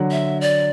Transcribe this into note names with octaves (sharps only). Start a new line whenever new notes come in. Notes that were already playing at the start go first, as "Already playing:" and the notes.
Already playing: D3 F#3
E5
D5